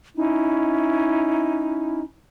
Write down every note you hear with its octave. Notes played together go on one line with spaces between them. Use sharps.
C#4 D#4 E4